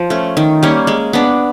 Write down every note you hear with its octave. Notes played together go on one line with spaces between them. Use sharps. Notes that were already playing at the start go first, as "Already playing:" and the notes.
Already playing: F3
A3 C#4
D#3
G3 A#3 C#4
G#3
B3 D4